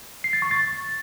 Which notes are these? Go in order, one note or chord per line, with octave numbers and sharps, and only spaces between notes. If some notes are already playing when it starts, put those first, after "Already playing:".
C7
A6
C#6
A6